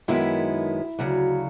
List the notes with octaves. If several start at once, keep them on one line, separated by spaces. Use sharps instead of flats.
F#2 D#3 G#3 B3 E4
D2 C#3 F#3